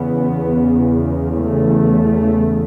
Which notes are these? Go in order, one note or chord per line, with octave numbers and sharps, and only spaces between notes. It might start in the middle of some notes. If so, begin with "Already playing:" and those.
Already playing: E2 C#3 B3
A3